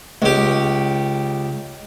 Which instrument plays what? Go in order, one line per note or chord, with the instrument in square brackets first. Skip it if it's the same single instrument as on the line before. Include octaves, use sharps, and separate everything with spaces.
[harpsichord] C#2 G4